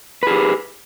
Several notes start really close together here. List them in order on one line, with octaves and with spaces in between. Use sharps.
B4 G#4 G4